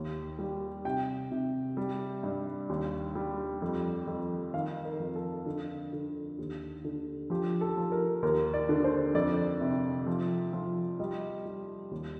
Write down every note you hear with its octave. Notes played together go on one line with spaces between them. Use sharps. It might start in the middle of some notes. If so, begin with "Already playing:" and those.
Already playing: D#2 F5
G3
C3 G5
C3
G3
G2
D#2
G3
F2
F2
D#3 F5
A#4
F2
A4
D3
D3
D#2
D3
F3 G4
A4
F3
A#4
D#2 A#4
D5
D3
C5
F2 D5
C3
F3
F3
G3 D#5
G3
D#2